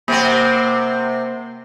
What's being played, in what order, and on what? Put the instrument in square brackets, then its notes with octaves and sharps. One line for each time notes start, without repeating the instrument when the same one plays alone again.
[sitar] C3 C4 [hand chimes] A#3 [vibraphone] C5 F#5